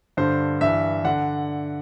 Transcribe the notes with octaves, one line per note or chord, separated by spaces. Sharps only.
G2 D3 C5
G2 E3 E5
D3 F#5